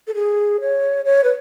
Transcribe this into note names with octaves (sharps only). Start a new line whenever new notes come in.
A4
G#4
C#5
C#5
B4